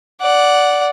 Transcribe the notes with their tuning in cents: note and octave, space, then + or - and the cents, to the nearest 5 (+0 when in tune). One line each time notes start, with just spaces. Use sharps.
D5 -10 F#5 +0